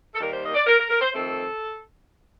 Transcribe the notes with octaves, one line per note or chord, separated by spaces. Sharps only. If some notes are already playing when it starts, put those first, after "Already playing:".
A4
D#2 D#3 G3 A#3 A#4
C5
D#5
D5
A#4
A#4
A#4
C5
F2 D#3 A3 C4 A4